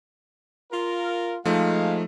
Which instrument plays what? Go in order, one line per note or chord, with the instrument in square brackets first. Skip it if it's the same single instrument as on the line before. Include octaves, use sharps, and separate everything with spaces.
[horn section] F4 A#4
[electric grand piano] F3 A3 D#4 [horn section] G#3 F5